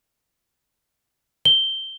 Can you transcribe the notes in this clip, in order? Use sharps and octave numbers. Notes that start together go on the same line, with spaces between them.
G7